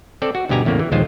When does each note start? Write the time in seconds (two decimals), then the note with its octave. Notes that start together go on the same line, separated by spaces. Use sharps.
0.22 C4 A4 D5
0.35 F#4
0.49 D2 G2 B2 G4 G#5 A#5
0.65 E2 A2 C#3 A#3
0.79 E3
0.92 A#1 D#2 G#3 F4 C5